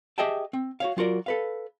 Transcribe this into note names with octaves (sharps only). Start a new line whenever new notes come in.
G4 G#4 D#5 E5 G5 A5
C4
F#4 C#5 F5
F#3 F4 F#4 A#4 D5
A4 B4 F5